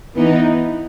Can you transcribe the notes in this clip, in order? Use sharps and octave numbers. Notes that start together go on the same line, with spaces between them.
E3 B3 D#4